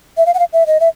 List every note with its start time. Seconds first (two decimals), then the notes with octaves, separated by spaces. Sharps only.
0.17 E5
0.26 F5
0.34 F#5
0.39 F5
0.53 E5
0.66 D#5
0.80 E5